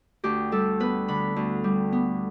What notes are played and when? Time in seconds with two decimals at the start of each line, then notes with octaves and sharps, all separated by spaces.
0.24 D2 G4
0.52 G3 A4
0.80 B3 B4
1.08 D3 B5
1.36 D2
1.64 G3
1.92 B3